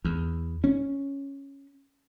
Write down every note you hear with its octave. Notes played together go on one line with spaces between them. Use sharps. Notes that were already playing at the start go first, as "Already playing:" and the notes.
E2
C#4